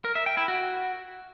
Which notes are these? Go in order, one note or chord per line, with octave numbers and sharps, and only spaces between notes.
A#4
E5
G5
E4
F#4